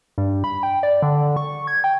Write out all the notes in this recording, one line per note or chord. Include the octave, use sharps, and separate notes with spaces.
G2
B5
G5
D5
D3
C#6
G#6
G5